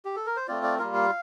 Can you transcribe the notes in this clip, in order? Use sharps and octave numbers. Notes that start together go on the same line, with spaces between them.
G4
A4
A#4
C5
A3 C4 F4 D5
D5
G3 A#3 F4 A#4
F5